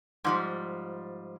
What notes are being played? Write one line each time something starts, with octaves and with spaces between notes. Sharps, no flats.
G#2 F3 G3